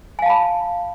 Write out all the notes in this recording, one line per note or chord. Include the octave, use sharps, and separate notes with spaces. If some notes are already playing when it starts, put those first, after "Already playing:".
F5 G#5 A5 B5